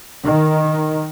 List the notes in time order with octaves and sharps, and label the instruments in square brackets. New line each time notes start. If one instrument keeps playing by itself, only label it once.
[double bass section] D#3